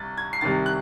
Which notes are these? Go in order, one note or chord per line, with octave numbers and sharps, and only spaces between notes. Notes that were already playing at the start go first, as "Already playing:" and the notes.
Already playing: C2 A6
G#6
C7
C2 C3 D#3 A6
F#6